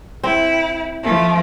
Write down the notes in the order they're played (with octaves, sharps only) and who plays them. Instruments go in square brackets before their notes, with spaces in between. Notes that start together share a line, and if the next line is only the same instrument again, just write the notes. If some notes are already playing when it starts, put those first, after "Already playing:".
[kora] C4 [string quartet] E4
[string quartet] F3 A3